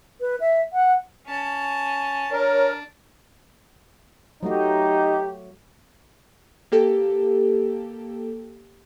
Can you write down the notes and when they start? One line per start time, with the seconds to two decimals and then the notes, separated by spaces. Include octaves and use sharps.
0.21 B4
0.40 E5
0.73 F#5
1.27 C#4 A5
2.32 D4 A#4 C#5
4.43 F#3 A3 D#4 F#4 G4
6.72 A#3 G4 A4